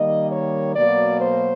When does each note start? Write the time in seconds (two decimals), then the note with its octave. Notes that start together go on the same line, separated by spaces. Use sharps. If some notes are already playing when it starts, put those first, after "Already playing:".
Already playing: D#3 G3 A#3 D#5
0.32 C#5
0.75 B2 F#3 A#3 D5
1.20 C5